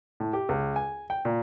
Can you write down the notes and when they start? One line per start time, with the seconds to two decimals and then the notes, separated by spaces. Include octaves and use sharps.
0.20 A2
0.33 G4
0.49 C#2
0.76 G#5
1.10 G5
1.25 A#2